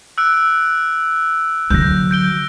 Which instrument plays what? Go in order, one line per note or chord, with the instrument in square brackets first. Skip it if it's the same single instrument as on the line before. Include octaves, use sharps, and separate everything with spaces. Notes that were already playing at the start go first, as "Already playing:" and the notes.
[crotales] E6 F#6 D7
[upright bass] D3 F#3 [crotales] G6 A#6
[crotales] G6 D7 G7